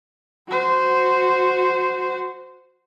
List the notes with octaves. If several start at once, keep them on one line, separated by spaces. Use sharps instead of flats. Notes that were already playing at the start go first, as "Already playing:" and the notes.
F#4 C5